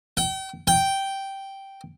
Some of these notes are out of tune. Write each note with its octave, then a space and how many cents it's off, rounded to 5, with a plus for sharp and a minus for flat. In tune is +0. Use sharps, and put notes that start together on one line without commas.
G5 -35
G5 -5